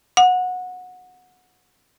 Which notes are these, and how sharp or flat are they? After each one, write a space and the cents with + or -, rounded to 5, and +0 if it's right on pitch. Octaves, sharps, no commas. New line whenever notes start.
F#5 -20